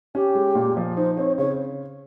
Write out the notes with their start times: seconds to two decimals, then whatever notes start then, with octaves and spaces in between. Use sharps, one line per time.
0.15 C#4 G4
0.35 G#3
0.55 A#2
0.77 F3
0.97 D#4 C5
1.17 C4 C#5
1.38 C#3 C#5